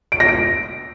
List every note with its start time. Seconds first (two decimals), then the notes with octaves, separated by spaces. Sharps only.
0.12 D7
0.20 A#6
0.28 D7